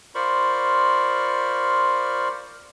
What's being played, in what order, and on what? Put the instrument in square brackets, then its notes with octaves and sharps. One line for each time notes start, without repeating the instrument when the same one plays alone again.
[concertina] F4 A#4 C5 D5 B5 C#6